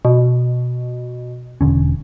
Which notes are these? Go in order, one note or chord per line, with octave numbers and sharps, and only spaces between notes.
B2
E1 D3 C#4